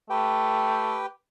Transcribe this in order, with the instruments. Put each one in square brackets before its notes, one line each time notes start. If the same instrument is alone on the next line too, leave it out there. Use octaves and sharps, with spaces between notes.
[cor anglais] A3 [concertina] G4 B4 G5